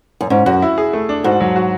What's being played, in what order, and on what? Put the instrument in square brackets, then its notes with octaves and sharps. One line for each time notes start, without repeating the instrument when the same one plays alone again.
[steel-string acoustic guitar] F#2
[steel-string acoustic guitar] G#2 [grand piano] C#4
[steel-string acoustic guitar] F#2 [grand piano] F#4
[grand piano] E4
G#4
A3
D4
[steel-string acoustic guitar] G#2 [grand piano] F#4
[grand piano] F#3
F#4